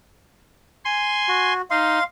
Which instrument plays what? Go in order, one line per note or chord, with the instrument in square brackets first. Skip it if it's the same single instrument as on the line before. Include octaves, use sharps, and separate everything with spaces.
[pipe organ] G#5 C6
[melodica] F#4
[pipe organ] D#4 [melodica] F5 C6